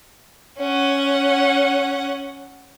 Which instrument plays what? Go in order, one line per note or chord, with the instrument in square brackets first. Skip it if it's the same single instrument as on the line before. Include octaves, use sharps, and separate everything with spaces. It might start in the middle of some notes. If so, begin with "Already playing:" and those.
[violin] C#4 F#5